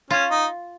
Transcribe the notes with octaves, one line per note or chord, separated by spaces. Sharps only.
C#4 F4
D#4